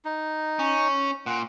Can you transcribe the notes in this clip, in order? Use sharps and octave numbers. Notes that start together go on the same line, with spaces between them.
D#4
C#4
A#2 F#5